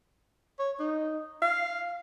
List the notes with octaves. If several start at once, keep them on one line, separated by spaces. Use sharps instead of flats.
C#5
D#4
F5